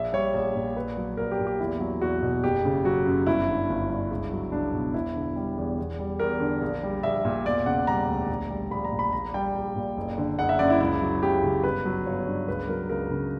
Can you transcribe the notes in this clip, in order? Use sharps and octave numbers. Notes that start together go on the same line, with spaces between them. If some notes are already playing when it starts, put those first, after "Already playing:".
Already playing: A#1 E5
G3 C#5
A#1
A#2
A#1 B4
F#3
A#1 A#4
G4
A#2
G4
E2 E4
F#3
E2 F#4
B2
F#1 G4
C#3
F#3 F#4
F#2
G1 E4
D3
G1
G2
C#2
F#3
C#2 D4
B2
E1 E4
D3
G3
E2
E2
G3
E2 A#4
D3
A#1
G3
A#1 E5
A#2
E1 D5
C#3 F#5
G3 A#5
D2
A#1
G3
A#1 B5
A#5
A#2
B5
A#1 A#5
G3 G5
A#1
A#2
F#1
D3
F#1 F#5
E5
F#2 D5
E4
C#2 E4
F#3
C#2 G4
C#3
G1 B4
F#3
G1 C#5
G2
C#2 B4
F#3 A#4
C#2 A#4
C#3